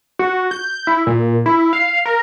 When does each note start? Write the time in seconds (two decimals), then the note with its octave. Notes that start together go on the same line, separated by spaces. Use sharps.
0.19 F#4
0.51 G6
0.87 E4
1.07 A#2
1.46 E4
1.73 F5
2.05 A#4